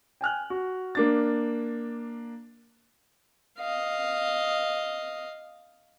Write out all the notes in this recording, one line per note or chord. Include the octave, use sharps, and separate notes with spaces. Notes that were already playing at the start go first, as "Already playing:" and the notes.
G5 G#5 F6 F#6
F#4
A#3 D4 A6
D#5 F5